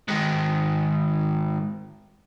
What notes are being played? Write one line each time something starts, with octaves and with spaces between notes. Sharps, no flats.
G#2 D#3